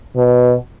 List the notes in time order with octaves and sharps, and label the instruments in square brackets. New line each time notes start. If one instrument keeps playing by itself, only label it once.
[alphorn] B2